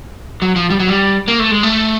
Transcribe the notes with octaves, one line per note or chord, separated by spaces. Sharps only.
F#3
F3
G3
F#3
G3
A#3
A3
G#3
A3